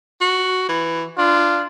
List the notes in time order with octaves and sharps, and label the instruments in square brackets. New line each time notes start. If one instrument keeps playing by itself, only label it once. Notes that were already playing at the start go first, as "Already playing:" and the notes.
[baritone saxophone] F#4
E3
[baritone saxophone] D4 [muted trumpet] F4